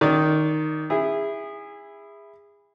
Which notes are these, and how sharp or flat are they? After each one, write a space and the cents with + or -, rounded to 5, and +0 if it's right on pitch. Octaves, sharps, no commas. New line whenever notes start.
D#3 +0 D5 -30
E4 +0 G#4 -25